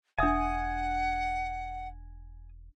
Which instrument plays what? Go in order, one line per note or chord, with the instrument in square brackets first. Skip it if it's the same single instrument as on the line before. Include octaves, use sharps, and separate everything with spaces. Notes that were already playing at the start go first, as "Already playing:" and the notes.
[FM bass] E1 [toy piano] D4 E5 [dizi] F#5 [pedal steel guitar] G#5 D#6